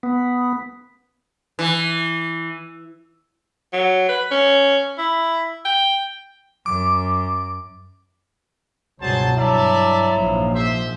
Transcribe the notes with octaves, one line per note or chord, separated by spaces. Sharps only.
B3
E3
F#3
B4
C#4
E4
G5
F#2 D6
C#2 G2 B2 F#3 G#4 C5 A5
G2 F#3 E4 D5 E5 A5
A#1 G#2 F3
C5 E5